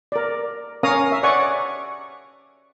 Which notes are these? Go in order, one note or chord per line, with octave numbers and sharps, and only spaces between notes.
A#4 D5
C#4 A#4 C#5 F5 A#5 D#6
E5
C#5 D5 F#5 G#5 C#6